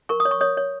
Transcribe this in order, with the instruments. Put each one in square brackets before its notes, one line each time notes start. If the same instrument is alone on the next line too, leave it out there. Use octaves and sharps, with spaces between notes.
[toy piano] A#4 C#6
D#6
C#5
C#6
C#5 D#6
C#5